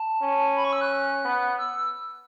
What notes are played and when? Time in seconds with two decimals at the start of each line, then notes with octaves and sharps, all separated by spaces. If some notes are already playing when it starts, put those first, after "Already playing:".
Already playing: A5
0.22 C#4
0.56 B5
0.64 C#6
0.73 E6
0.81 F#6
1.24 B3
1.58 E6